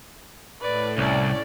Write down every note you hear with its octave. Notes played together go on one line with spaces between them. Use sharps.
A2 B4 D5
C2 C#4 D5